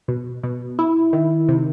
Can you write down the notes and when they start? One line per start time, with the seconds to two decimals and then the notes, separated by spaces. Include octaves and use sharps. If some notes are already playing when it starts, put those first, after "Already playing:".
0.08 B2
0.43 B2
0.79 E4
1.13 D#3
1.49 C3